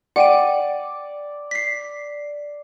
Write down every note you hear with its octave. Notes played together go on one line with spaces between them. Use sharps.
D5 F#5 G5 D#7
B6 C7